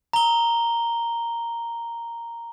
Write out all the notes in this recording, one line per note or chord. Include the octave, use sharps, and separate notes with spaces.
A#5 G7